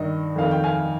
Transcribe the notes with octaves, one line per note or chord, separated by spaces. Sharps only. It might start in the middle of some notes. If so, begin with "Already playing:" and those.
Already playing: G2 D#3 D#5
F2 D#3 F5
G5
F5 G#5